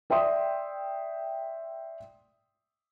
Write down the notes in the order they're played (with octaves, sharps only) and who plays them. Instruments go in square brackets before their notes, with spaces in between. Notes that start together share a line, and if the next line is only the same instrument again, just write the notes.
[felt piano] D5 E5 G5 C6 D#6